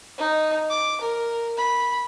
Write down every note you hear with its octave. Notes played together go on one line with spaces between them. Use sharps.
D#4
D6
A#4
B5